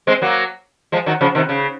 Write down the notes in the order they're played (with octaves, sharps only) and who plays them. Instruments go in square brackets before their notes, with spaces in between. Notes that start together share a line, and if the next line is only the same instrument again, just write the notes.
[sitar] G#3 C4
F#3 A#3
F3 G#3
D#3 F#3
C#3 F3
C3 D#3
C#3